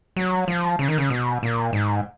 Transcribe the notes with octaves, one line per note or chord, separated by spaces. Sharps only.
F#3
F3
C#3
D#3
C#3
B2
A#2
G#2